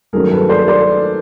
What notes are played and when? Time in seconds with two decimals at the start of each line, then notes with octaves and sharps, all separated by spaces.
0.13 G2 D#3 F#3 A3 C#4 G#4 A#4
0.31 A4 B4
0.49 C5 D5
0.68 C5 D5